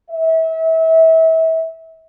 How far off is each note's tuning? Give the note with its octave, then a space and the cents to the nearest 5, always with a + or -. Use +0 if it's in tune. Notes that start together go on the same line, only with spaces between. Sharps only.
E5 -30